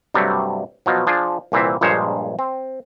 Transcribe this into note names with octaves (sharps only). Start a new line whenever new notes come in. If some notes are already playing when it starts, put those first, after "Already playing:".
G2 C3 F#3 G3 A3
B2 F3 F#3
F3 D4 G#4
C2 A#2 E3 C4 E5
A#1 G2 A#2 G#3 C5 C#5
C4